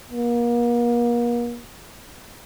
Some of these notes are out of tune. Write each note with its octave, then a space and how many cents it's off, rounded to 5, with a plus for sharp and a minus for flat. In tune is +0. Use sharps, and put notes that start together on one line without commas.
A#3 +40